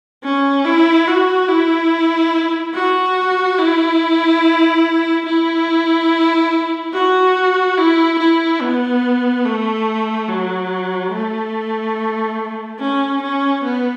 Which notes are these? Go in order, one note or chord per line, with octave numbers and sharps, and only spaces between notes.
C#4
E4
F#4
E4
F#4
E4
E4
F#4
E4
E4
B3
A3
F#3
A3
C#4
C#4
B3